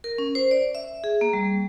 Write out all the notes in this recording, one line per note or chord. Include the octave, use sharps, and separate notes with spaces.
A#4
C#4
C5
D5
E5
G#4
A#3
G3